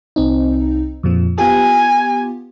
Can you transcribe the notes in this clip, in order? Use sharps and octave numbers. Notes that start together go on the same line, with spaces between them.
C2 C4 D#4
F2 A#2 F3
B3 F4 G4 G#5